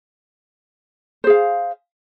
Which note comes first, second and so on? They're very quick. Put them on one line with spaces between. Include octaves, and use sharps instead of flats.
C5 G#4 F5